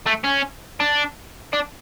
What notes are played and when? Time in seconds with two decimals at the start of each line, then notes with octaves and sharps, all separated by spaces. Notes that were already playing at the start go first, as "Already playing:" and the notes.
0.07 A3
0.24 C#4
0.80 D4
1.53 D4